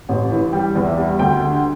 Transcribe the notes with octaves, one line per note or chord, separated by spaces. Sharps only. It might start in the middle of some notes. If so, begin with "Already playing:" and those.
A1
E3
G3 G5
E2
E5
G3
D2 G5
D3